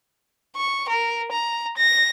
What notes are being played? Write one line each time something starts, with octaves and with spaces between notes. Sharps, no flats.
C#6
A#4
A#5
A#6